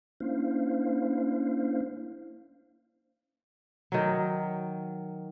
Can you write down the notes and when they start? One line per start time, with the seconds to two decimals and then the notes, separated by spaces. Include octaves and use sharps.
0.20 A#3 C#4 D4 E4 C5 F5
3.92 D#3 F#3